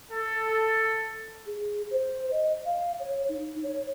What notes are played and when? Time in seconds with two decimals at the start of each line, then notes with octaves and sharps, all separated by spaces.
0.10 A4
1.46 G#4
1.91 C5
2.31 D#5
2.65 F5
2.99 C#5
3.29 D#4
3.63 C#5